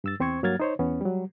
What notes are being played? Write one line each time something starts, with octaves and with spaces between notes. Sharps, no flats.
G2 E6 A6
E2 C4 C5 C#6 G#6
G2 F#3 A#3 F6 G#6 A6
D#4 C5 C#5
E2 B3 C#4
F#3 G3